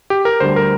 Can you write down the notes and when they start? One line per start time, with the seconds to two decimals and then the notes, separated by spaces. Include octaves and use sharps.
0.10 G4
0.25 A#4
0.40 D2 D3 G3 C5
0.56 A#4